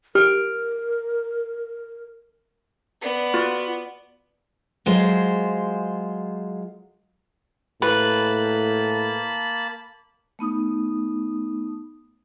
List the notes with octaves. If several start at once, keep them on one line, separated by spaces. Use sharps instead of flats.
G4 A#4 F6 D7
B3 D5
F4 F#4
F#3 G#3 F4 C5
A2 A#3 B4 A5 B5
A3 B3 D#4 D#6